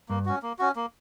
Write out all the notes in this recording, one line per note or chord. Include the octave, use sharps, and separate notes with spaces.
G2 A#3
C#4 F#4
A#3
C#4 F#4
A#3